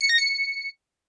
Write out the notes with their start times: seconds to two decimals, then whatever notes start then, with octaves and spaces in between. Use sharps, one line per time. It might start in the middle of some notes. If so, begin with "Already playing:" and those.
0.01 C#7
0.09 A#6
0.18 C#7